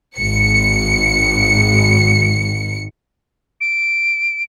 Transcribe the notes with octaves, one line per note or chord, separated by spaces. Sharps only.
G#1 C#7
D7